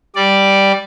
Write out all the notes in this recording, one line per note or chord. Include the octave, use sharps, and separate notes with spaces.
G3 D5